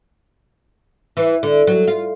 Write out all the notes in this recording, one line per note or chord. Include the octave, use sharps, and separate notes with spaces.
E3
D3
F#3
F4